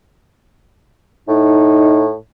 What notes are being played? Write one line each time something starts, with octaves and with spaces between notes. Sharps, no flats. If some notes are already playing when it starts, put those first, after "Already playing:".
A2 D#4